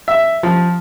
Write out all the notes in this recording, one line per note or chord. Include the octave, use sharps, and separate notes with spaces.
E5
F3